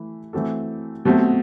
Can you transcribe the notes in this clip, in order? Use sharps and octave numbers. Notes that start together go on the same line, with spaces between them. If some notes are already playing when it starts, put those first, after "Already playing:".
Already playing: E3 A3 E4
E3 A3 C4 F#4 A4
B2 F#3 A3 C4 F#4